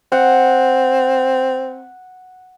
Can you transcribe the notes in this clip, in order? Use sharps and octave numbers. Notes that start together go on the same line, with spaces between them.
C4 F#5